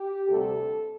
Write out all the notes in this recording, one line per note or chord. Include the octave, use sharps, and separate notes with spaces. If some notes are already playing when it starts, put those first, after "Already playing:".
Already playing: G4
D2 C3 G3 A4